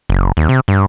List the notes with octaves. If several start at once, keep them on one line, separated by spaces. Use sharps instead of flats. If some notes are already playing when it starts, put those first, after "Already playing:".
F#1
D#2
C3
G2